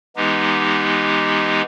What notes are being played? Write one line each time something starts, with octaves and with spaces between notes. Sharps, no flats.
E3 G#3 B3 D#4 G4